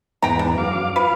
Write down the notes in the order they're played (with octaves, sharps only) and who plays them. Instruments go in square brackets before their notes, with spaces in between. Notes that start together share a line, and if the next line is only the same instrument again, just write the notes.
[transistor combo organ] E2 G#2 B3 [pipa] G5 A#5
[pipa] D4
[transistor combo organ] F#2 F5 D6
[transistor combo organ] F4 F5 [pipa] B4